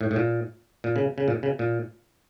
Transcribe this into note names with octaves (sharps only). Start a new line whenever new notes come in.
A2
A2
A#2
A#2
C#3
C#3
A#2
C#3
A#2